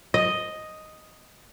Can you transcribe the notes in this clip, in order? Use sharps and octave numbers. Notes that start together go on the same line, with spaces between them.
D#5